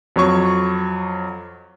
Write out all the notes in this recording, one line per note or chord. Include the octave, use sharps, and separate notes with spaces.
F2 F#3 C#5 C#6